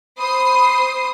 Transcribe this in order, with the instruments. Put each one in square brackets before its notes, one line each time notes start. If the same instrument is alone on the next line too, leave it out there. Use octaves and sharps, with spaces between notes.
[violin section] C5 D#6 C7 [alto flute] B5